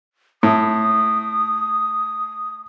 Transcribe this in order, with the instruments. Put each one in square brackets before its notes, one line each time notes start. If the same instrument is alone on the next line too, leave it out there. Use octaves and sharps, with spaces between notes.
[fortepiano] A2 [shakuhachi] D#6